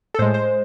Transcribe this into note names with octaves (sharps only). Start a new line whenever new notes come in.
A4
A2 G#3 C5
C5